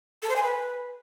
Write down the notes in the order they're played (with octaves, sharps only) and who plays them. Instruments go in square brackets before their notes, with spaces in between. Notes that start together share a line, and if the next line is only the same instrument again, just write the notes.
[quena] A4
C5
G#5
B4